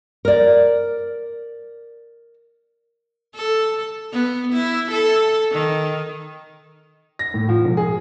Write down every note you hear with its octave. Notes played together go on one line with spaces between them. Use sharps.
A#4 D5
A4
B3
E4
A4
D#3
A#6
A2
F3
E1
G#4